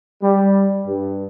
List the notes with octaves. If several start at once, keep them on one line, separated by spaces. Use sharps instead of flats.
G3
G2